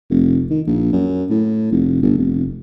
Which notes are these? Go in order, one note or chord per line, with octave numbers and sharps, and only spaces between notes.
F1
D#3
A#1
F#2
A2
F1
G1
F1